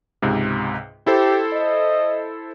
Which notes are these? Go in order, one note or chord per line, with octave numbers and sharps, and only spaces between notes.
C#2 G#2 C3
E4 G4 A4 C5
D#5